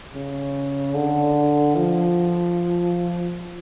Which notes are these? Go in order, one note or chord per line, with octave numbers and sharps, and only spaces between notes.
C#3
D3
F3